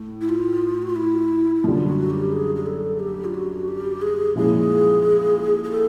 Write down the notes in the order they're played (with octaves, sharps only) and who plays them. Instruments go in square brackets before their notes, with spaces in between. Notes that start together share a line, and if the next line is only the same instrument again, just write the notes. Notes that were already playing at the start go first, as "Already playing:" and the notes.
Already playing: [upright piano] A2
[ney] E4
F4
F#4
F4
E4
E4
[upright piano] F#2 D3 G3 [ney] F4
[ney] F#4
G4
G#4
G#4
A4
G4
F4
F#4
G4
G#4
[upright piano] A#2 F3 G#3 C#4 E4 [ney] G#4
[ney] G#4
A4